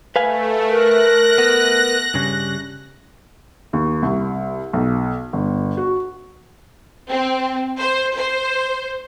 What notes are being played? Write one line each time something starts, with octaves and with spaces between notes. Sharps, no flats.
A3 B4 F5 G#5
A#4 F#6 A#6
B3
G2 C#3 G3
D#2
C2
B1
G1
F#4
C4
C5
C5